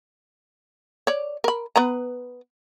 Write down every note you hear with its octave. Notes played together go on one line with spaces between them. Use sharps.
C#5 D5
A#4 B5
B3 B4 A#5